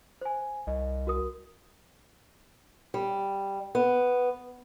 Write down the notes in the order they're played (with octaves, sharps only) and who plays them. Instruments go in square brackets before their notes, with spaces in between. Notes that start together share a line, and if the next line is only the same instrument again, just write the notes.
[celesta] C5 G#5
[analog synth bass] C2 [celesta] D#5
[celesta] F#4 A#4 D#6
[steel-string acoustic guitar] G3
B3